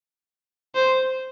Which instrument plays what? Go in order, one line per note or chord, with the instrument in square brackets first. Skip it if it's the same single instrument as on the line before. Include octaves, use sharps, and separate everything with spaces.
[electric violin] C5